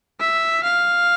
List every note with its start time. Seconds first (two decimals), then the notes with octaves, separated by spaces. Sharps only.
0.21 E5
0.64 F5